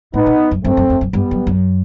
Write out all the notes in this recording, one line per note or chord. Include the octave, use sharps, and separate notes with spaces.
A2 B3 D#4
B2
F#2
G2 A3 C4
F#2
E2
F#2
G2 G3 B3
F#2
F#2